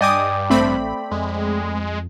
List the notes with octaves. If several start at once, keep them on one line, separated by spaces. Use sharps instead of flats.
G2 D5 D#5 G5 G#5 D6 D#6
A1 A3 C4 B5
F2 G#3